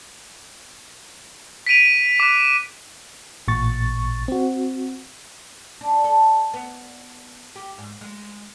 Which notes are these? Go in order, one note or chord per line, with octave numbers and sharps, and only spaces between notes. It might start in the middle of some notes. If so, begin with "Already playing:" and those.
B6 D7 D#7 F7
D6 F#6
A1 A#2 C#6 A6
C4 F#4
D4
A4
B3
G4
G#2
G#3